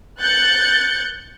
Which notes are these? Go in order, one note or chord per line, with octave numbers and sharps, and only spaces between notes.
F#6 G6 A6 C#7